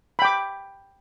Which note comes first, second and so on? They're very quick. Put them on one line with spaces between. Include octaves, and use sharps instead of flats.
B5 G5 D6